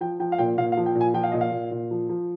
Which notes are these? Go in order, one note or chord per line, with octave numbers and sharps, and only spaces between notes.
F3 G5
F3 G5
F5
A#2 G5
A#2 F5
F5
F3
G5
A#2
G#5
F3 G5
F5
A#2 D#5
F5
A#2
A#2
F3
F3